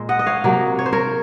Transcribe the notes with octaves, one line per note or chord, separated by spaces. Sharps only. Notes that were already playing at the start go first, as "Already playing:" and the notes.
Already playing: A#2 G#3 C5
D#5 F#5
D#5
C#5 F5
C3 F#3 A#3
C#5
C5
A#4 C#5